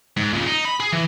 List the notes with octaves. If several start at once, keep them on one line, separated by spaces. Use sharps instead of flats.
G#2
A#2 C#3
D#4
B5
G#4
E3